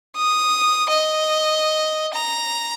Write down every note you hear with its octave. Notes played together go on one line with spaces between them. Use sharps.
D#6
D#5
A#5